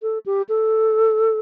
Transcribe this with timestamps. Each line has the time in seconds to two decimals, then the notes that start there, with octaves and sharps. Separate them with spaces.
0.02 A4
0.26 G4
0.49 A4